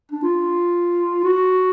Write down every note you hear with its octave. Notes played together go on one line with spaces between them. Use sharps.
D4
F4
F#4